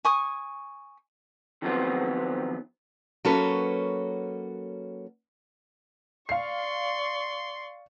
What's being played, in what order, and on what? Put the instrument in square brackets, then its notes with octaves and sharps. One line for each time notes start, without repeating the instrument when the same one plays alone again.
[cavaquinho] G#5 C#6 D#6
[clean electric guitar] D#3 F3 F#3 B3 C4 F4
[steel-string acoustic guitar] F#3 A#3 C#4 F#4 A4 B4
[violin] D5 C#6 [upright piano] F5 C7 [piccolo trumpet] C6